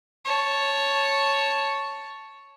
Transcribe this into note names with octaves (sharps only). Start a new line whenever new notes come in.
C#5 A5